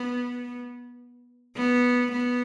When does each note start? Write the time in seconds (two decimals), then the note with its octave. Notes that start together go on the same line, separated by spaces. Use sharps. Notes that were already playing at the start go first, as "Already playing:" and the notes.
Already playing: B3
1.57 B3
2.12 B3